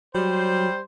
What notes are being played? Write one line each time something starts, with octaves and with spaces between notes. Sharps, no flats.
F#3 G3 C5